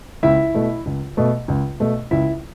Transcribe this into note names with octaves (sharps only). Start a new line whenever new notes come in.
C#2 E4 E5
B2 A3
C#2
B2 A3
C#2
B2 A3
C#2 E4 E5